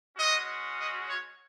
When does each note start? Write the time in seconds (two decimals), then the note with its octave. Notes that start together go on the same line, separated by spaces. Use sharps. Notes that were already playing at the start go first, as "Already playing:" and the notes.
0.17 G#3 C#4 F#4 D#5
0.78 D#5
1.09 C#5